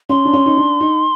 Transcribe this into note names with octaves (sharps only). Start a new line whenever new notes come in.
C#4 C6
D4
C#4
D#4
D4
D#4